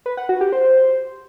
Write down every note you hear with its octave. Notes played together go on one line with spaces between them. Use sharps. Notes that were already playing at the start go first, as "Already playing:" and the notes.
B4
F#5
F#4
G4
C5